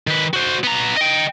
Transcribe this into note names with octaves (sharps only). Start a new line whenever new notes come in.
D#3 B4
F#4 C5
B3 A#5
D#5 G5